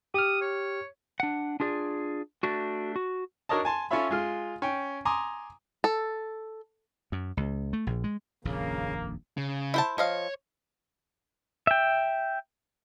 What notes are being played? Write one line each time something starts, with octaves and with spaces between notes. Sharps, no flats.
G4 D#6 F6
C#5
D4 F#5
D4 F4 G#4 D5
A3 D4 F#4
F#4
D4 F#4 A#4 C#5 D#5 A5
G#5 A5 C6
C#4 F4 A4 C#5 E5 B5
G#3 F4 F6
C#4 G5
G#5 A#5 C6 D6 D#6
A4
F#2
C#2
A3
A#1
G#3
D#1 A#1 F2 C#3 A#3
C#3
E4 C5 A5
F3 C#5 D#5 F5
E5 G5